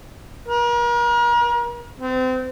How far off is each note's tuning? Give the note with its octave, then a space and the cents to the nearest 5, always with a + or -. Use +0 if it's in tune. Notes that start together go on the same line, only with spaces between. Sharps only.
A#4 +40
C4 -30